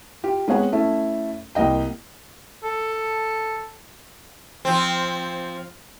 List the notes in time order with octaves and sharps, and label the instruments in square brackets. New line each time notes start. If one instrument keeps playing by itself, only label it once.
[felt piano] F4 G4
G#3 B3 C4 C#5 F#5 G#5
A3 C#4 E4 A4
C2 A#3 D#5 G5
[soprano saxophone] A4
[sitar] F3 C4